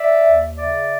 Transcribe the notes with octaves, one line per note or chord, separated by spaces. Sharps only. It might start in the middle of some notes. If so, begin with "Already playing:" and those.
Already playing: D5 E5
D#2
C#3 D5 E5